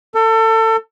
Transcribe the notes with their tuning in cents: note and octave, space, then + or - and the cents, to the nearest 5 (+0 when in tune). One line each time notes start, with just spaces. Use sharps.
A4 +30